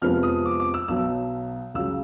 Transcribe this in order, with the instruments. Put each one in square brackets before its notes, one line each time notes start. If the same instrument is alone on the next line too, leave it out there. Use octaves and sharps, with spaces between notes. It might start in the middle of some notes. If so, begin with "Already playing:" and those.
[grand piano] F2 C3 F3 G#3 B3 F6
D#6
D6
D6
E6
B1 B2 F#3 E6
C#2 C#3 F#3 E6